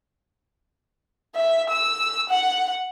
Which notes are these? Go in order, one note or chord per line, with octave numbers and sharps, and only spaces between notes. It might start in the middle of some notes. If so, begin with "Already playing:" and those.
E5
E6
F#5